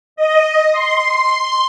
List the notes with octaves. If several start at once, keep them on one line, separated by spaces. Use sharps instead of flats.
D#5
C6